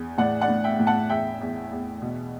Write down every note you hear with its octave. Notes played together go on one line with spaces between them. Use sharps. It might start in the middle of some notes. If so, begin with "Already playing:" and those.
Already playing: E2
A2 D5 F#5
D5 F#5
A2
E5 G5
A2
F#5 A5
E2 E5 G5
E2
E2
B2